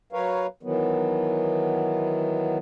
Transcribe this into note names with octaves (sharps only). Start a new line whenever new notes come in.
F#3 A#4 B4 C#5 F5
D#3 E3 F#3 B3